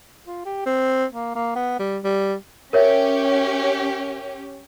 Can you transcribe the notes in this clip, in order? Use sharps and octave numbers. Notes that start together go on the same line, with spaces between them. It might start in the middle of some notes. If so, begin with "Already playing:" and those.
F4
G4
C4
A#3
A#3
B3
G3
G3
C#4 G4 A#4 C#5 E5